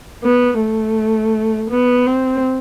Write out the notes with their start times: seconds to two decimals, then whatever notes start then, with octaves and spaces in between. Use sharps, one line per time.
0.24 B3
0.60 A3
1.70 B3
2.07 C4